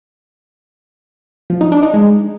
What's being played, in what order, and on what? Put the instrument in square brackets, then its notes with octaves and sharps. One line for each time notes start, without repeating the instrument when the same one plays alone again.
[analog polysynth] F3
D#4
D4
D#4
G#3